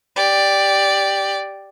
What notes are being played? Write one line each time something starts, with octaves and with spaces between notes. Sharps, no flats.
G4 D5